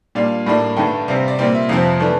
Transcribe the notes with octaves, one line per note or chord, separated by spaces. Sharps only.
A#2 G3 D4 F5
A2 G3 A#3 D4
G2 D3 A3 G5
C3 G3 C4 F5
D5
A#2 G3 C4 D5
E5
F2 C3 F3 C4 F5
E3 A3 D4